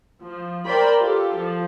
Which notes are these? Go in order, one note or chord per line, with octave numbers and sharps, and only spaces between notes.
F3
A#4 C5 D5 G5 B5
F4 G4 A4
F3